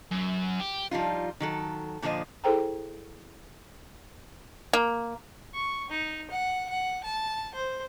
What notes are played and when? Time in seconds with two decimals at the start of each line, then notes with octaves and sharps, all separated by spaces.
0.11 F#2
0.60 G4
0.91 F3 G3 D#4 F4
1.40 D#3 F#3 A4
2.02 A#2 D3 F3 C5 D#5
2.44 E4 G#4 A4 C5 G5 A#5
4.73 A#3
5.54 C#6
5.90 D#4
6.31 F#5
6.69 F#5
7.04 A5
7.54 C5